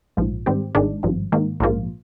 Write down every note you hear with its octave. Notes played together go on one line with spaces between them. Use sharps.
A#1 G#2 F3
G#2 D#3 G3 C4 G4
G#1 G#2 D#3 G#3 D4
G#1 G2 F3
G#2 D#3 A#3
A#1 G#2 F3 A#3 F4